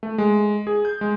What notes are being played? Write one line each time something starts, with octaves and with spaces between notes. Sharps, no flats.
A3
G#3
G#4
G6
G#3